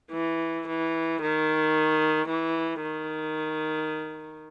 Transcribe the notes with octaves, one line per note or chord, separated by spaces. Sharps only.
E3
E3
D#3
E3
D#3